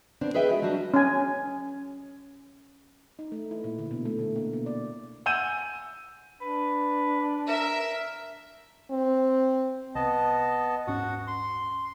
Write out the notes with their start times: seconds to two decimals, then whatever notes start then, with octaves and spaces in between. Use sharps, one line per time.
0.21 C#3 B3 C4 D4
0.34 G#4 B4 D#5 E5 G5
0.50 G#3 F#4
0.62 F#3 G3 D4 F#4
0.94 C#4 G#5
3.19 D#4
3.32 A3
3.51 E4
3.64 A#2
3.78 D3
3.91 B2
4.05 A3
4.19 D3
4.36 A#3
4.53 B2
4.66 D5
5.26 F#5 G#5 E6 G6 D#7 E7
6.41 D4 B4
7.48 A#4 E5
8.91 C4
9.95 C2 B3 D#5 A5
10.87 D#1 G#2 C#4 F#4 F#5
11.27 C6